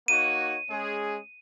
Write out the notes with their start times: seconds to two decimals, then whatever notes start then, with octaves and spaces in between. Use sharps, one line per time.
0.08 A#3 D#4 F#4 C#5 D#7
0.70 G#3 C#4 G#4